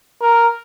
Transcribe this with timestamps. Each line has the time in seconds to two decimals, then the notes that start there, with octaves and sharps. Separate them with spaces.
0.21 A#4